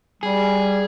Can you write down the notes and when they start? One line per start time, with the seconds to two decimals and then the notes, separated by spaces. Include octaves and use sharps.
0.23 G3 G#4